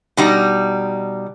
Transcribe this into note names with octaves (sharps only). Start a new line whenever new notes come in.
B2 G3 D#4